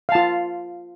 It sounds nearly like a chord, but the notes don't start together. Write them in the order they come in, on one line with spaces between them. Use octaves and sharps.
F5 A5 F4